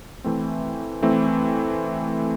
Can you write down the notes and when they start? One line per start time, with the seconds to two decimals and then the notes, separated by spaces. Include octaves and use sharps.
0.24 E3 A3 C4
1.02 E3 A3 C4